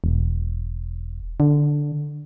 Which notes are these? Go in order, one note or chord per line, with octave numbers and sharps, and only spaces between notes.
E1
D3